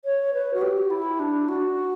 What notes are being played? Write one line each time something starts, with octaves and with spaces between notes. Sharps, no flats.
C#5
B4
F#4
G4
E4
D4
F#4